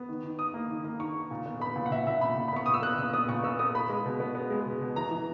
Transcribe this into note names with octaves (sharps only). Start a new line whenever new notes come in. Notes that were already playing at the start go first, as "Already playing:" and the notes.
Already playing: B3
D#3
D#3
D#3 D#6
A#3
D#3
A#3
D#3 C#6
D#3
A#2
B3
B3 B5
A#2
F#5
A#2 E5
A#2 E5
A#2 B5
A#2
B5
B3 C#6
A#2 D#6
E6
B3 F#6
A#2 E6
B3 D#6
A#2 C#6
B3 E6
B3 D#6
B3 B5
G#3
B2
B3
B3
G#3
B2
B2
E3 A#5
E3